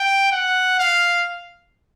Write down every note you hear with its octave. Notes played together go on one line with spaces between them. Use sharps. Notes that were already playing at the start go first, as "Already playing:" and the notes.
Already playing: G5
F#5
F5